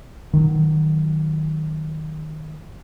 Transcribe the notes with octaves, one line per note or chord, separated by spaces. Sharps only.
D#3 F#3